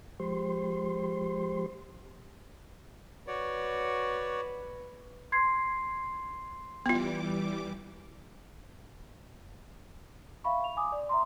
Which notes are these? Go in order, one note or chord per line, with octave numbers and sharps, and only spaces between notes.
F3 G#3 G4 C5 C6
F#4 B4 C#5 D5
C6 G#6 C7
E3 G3 B3 F4 D6
E5 F5 B5 C#6
F7
G#5 D6 D#6
D5
E5 A#5 C6